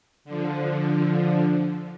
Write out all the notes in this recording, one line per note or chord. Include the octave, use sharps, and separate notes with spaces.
D3 F3